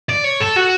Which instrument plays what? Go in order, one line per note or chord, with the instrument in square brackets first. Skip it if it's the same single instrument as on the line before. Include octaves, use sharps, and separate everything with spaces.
[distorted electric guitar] D5
C#5
A4
F#4